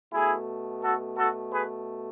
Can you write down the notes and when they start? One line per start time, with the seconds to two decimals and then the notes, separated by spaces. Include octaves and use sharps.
0.13 B2 A3 E4 G#4
0.83 F#4 A4
1.17 F#4 A4
1.52 G#4 B4